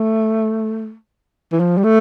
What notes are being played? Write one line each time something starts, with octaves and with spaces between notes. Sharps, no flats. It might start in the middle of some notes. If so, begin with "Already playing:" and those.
Already playing: A3
E3
F3
G3
A3